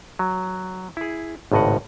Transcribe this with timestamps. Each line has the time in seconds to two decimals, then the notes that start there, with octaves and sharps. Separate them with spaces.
0.19 F#3
0.97 E4 G#4
1.52 G#1 C#2 A2 D#5 F#5